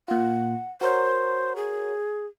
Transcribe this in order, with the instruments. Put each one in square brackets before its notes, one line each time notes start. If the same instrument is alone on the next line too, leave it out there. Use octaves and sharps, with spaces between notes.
[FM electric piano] A#2 F4 [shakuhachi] F#5
[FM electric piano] F#4 A#4 C#5 [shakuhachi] C5
[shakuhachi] G#4